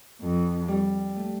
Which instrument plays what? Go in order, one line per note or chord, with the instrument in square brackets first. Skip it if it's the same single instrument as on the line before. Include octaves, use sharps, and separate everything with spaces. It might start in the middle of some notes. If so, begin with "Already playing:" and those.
[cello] F2
[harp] G3
A3